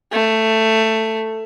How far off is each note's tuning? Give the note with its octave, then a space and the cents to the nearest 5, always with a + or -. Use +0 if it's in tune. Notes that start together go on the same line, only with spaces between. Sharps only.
A3 +10